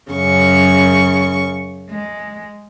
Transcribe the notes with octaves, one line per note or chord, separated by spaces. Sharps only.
F#2 C#3 C#6
G#3